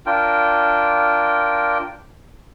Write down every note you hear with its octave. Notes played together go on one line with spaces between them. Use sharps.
D4 F4 A#4 G5